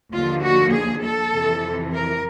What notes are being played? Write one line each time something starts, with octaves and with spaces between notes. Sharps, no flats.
D#2 D3 F3 A#3 F4
F#4
G#4
A4
F2 C3 E3
A#4